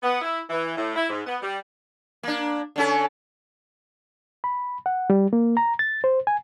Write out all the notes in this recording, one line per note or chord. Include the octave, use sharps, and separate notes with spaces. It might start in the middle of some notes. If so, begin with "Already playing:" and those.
B3
E4
E3
A2
E4
G#2
B3
G3
A#3 D4
D3 C#4 A4
B5
F#5
G3
A#3
A#5
A6
C5
G#5